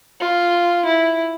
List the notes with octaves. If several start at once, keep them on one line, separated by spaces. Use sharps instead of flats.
F4
E4